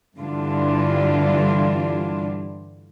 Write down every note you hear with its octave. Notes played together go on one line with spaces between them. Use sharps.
G2 D3 E3 G3 D4 F4